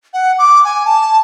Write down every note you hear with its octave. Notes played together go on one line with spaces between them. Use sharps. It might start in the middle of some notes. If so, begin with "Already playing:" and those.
F#5
D6
G#5
A5